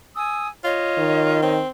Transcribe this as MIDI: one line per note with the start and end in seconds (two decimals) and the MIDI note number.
0.15 0.48 80
0.15 0.48 87
0.15 0.48 88
0.64 1.41 65
0.64 1.53 73
0.64 1.53 75
0.98 1.61 51
1.42 1.69 60